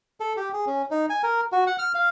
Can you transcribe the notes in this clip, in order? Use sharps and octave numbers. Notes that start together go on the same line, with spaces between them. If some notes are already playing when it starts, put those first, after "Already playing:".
A4
G4
G#4
C#4
D#4
G#5
A#4
F#4
F#5
F6
F5